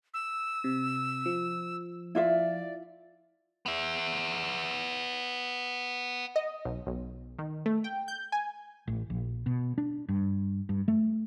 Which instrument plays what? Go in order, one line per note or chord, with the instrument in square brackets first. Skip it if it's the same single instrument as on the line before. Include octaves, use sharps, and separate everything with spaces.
[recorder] E6
[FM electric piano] C3
F3
[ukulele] E4 F4 E5 [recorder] D5
[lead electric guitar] B3 E5
[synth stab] D#5
B1
B1
D#3
A3
G5
G6
G#5
[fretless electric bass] A1
A#1
B2
D4
G2
G2
A3